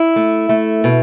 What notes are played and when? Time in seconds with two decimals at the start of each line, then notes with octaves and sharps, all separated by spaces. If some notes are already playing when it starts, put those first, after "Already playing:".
Already playing: E4
0.16 A3
0.49 A3
0.84 B2